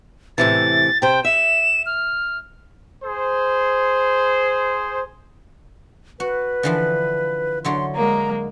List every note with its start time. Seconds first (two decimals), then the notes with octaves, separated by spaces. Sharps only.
0.38 A2 C3 E3 A6
1.02 C3 C5 G5
1.25 E5 E7
1.86 F6
3.04 G#4 C5
6.20 F#4 B4
6.63 D3 E3 F3
7.64 D3 F#3 E4 C6
7.95 G#3 A#3 A#5